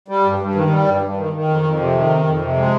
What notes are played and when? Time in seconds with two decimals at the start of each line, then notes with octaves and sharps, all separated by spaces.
0.08 G3
0.24 G2
0.39 G2
0.55 D#3
0.70 G3
0.86 G2
1.02 G2
1.17 D#3
1.33 D#3
1.48 F2
1.64 F2
1.80 C3
1.95 D#3
2.11 F2
2.26 F2
2.41 C3
2.57 G#3